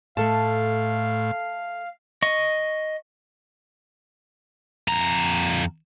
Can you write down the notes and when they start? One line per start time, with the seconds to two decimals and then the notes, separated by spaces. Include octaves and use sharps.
0.17 A2 A3 A4 F5 A5
2.22 D#5 C#6
4.88 F2 A#5